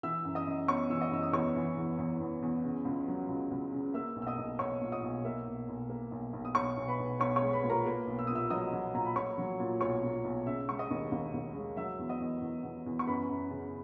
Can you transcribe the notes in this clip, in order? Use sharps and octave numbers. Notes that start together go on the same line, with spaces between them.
E3 E5 E6
F#2
D#5 D#6
F#2
B3 C#5 C#6
E3 E6
D#5 D#6
F#2 E6
D#6
E2 C#5 C#6
E3
E2
E2
E2
E2
C#3
C#2
F#3
C#2
C#2
C#3
A#3 E5 E6
B1
E6
D#5 D#6
B1
B1 C#5 C#6
A#2
D#5 D#6
B1
A#3 E5 E6
B1
B1
A#3
B1
B1
D#6
B1 C#5 C#6
B1
B4 B5
B1
B1 C#5 C#6
C#5 C#6
G#3
B4 B5
A#2
A#4 A#5
A#3 B4 B5
B1
E6
A#2 D#6
E5 E6
F#3 D#5 D#6
F#3
A#2 A#5
B5
A#2 C#5 C#6
F#3
A#2
B1 C#5 C#6
A#2
B1
C#3 E5 E6
G#3 C#6
D#5 D#6
D#2
D#2
D#2
G#3
F#3 E5 E6
E2
D#5 D#6
E2
E2
E2
E2
C#6
F#2 B4 B5
F#2
C#3